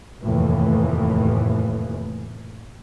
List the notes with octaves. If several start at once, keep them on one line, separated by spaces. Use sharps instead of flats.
F1 D#2 A2 E3